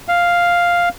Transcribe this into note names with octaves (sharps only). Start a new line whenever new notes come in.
F5